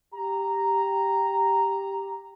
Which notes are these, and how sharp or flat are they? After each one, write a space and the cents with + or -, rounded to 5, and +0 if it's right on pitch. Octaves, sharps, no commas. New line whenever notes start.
G4 +0 A#5 -5